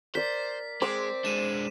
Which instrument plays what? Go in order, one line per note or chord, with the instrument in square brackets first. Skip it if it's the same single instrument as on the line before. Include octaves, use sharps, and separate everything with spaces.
[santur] A#4 D5 [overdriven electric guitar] C5 [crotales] B6
[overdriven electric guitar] G#3 [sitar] C4 [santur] D6
[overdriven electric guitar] G#3 D4 [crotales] D#7 E7